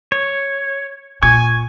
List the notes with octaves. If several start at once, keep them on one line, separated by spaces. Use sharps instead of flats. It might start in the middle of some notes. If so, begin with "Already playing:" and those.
C#5
A#2 G#5 C#6 G#6